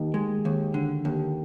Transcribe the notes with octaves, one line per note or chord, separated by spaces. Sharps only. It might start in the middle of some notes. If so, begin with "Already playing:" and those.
Already playing: D#2 D#4
G#3
D#2
D3
D#2